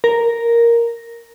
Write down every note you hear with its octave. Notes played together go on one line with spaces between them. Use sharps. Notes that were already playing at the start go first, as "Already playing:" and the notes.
A#4